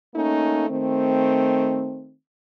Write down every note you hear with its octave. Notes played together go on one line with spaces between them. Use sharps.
A3 A#3 C#4 D#4
D#3 A3 C4